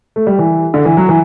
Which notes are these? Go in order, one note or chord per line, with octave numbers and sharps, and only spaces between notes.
A3
G3
E3
D3
E3
F#3
E3